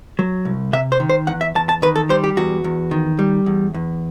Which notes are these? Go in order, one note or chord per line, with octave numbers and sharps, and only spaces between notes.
F#3
C2
C3 E5
C5
D#3
C5
E2 F#5
E5
E2 A5
A5
D#3 B4
A4
G3 C5
G4
E2 F#4
E2
D#3
G3
E2
E2